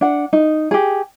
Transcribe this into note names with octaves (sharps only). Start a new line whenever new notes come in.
D4 F#5
D#4
G4 G#4